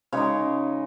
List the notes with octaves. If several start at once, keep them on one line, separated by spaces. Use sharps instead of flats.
C#3 G#3 D#4 C#5